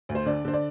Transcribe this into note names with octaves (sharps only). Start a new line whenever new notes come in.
D2
C5
D3 D5
D3 C5
D5